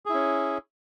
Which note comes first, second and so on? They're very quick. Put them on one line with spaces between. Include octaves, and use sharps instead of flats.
G#4 E4 C#4